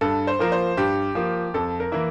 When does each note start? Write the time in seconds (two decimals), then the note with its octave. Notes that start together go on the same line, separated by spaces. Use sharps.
0.01 G2 A4
0.27 C5
0.39 F3 A#3 A#4
0.52 C5
0.77 G2 G4
1.15 F3 A#3
1.54 F2 A4
1.80 A#4
1.92 E3 A#3 E4